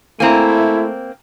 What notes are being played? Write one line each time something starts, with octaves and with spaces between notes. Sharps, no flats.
A3 A#3 C4 E4 G#5 A#5